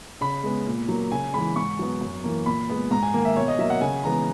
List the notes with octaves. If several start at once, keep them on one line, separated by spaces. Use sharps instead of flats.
C#3 B5
G#3 B3
A#2
F#3 A#3
C#3 G#5
E3 G#3 B5
G#2 C#6
F#3 B3
F#2
E3 A#3
A#2 B5
G#3 B3
G#2 A#5
G#5
D#3 A#3
E5
B2 C#5
D#5
F#3 A#3 E5
F#5
C#3 G#5
E3 G#3 B3 A#5